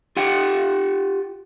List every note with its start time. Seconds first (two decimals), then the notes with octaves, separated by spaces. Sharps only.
0.17 F4 G4 F#5 G5